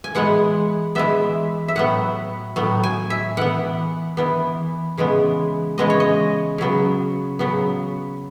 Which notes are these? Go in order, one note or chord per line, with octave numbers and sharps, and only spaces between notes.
G#5
E3 G#3 B3 F#5
E3 G#3 B3 E5
E5
A2 F#3 B3 F#5
A2 F#3 B3
G#5
E5
E3 B3 F#5
E3 B3
C#3 E3 G#3 B3
C#3 E3 G#3 B3 D#5
C#5
D#5
C#3 F#3 B3
C#3 F#3 B3